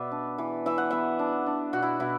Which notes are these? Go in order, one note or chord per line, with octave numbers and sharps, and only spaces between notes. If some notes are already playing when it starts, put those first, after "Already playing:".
Already playing: B2 B3 B4 D5 E5
D4
E3
E3 E5
F#5
B3 E5
D4
D4
B2 F#4
E4
B2 E4